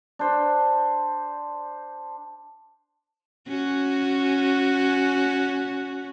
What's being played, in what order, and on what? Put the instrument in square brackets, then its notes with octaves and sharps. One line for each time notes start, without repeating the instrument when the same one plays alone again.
[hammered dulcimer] D4 C5
[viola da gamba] C#4 F#4